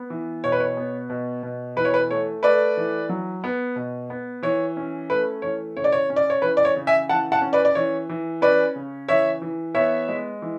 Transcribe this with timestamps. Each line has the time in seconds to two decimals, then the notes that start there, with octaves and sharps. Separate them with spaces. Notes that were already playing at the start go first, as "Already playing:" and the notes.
Already playing: B3
0.10 E3
0.44 B2 C#5
0.52 B4
0.60 C#5
0.77 B3
1.10 B2
1.43 B2
1.76 E3 B4
1.85 C#5
1.94 B4
2.10 A3 C#5
2.43 A3 B4 D5
2.77 E3
3.09 F#3
3.44 B3
3.76 B2
4.10 B3
4.43 E3 C#5
4.77 C#4
5.10 A3 B4
5.42 E3 C#5
5.76 C#3 C#5
5.84 D5
5.92 C#5
6.10 C#4
6.16 D5
6.30 C#5
6.42 E3 B4
6.57 D5
6.65 C#5
6.76 C#3
6.87 E5 G#5
7.09 E3 F#5 A5
7.32 F#5 A5
7.42 C#4
7.53 B4 D5
7.65 D5
7.75 E3 C#5
8.09 E3
8.42 C#4 B4 D5
8.76 C#3
9.08 E3 C#5 E5
9.42 E3
9.75 B3 C#5 E5
10.09 G#3
10.42 E3